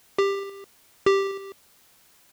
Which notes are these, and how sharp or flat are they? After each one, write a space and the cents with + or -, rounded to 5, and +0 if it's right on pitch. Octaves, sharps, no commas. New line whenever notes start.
G4 +15
G4 +0